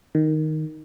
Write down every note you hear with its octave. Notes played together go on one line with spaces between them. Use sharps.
D#3